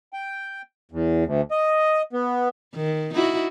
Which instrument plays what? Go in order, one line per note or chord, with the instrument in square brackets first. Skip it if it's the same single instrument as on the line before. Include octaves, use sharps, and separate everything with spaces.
[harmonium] G5
E2
D2
D#5
B3
[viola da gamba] D#3
D#4 E4 F#4